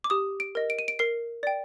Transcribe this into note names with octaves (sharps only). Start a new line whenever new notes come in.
D6
G4 D#6
D7
A#4 D#5
D7
D#7
D7
A#4 C7
D5 G5